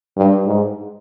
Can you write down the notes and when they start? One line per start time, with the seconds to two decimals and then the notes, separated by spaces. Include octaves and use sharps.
0.17 G2
0.46 G#2